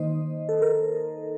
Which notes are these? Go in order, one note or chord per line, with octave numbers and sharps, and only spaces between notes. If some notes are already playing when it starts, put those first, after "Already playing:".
Already playing: D#3 A#3 D#4 C5 D#5
A4
A#4